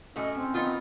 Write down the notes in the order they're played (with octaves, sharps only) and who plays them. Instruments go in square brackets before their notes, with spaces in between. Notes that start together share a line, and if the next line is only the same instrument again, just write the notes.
[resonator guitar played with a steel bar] A2 A3 F#4 [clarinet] C#4 [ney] D#5
[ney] C4
[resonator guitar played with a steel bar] D#3 B3 D#4 [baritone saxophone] F4